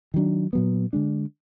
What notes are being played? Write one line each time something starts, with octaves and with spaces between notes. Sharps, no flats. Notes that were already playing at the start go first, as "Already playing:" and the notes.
D#3 F#3 D4
A#2 F#3 B3
D3 G#3 D4